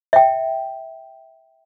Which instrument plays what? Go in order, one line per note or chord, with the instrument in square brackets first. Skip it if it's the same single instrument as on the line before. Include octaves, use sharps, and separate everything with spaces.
[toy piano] E5 G5